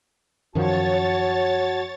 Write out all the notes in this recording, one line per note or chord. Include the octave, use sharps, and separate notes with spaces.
F#2 D#3 F3 F#4 C#5 A5 A6